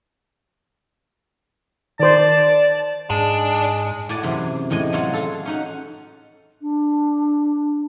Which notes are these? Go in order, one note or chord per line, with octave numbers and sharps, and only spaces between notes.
D#3 C5 D5 A5
G#2 G#3 D4
A2 F#4 D5 G#5 A5
F#2 C3 E3 G#4 C6
E2 A2 G#3 D#5 G#5
F#3 F4 F#4 C#5 F5
F4 G#4 A4
C#4 D#4 F#4
D4